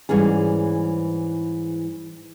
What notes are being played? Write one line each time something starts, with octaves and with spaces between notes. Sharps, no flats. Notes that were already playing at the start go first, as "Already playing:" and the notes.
G#2 E3 G3 C#4 G#4